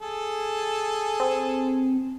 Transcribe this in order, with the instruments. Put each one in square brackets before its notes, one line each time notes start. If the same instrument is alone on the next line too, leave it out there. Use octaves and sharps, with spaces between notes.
[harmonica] G#4 A4
[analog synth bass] C4